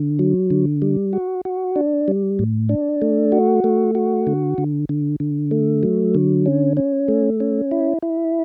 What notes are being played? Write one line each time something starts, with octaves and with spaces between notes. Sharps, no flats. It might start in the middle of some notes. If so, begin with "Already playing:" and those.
Already playing: D3
F#3
D3
G3
F#4
F#4
D4
G3
A2
D4
A3
F#4
A3
F#4
D3
D3
D3
D3
A3
F#3
D3
C#4
C#4
A3
C#4
E4
E4